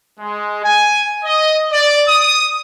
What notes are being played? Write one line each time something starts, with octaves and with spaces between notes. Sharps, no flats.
G#3
G#5
D#5
D5
D#6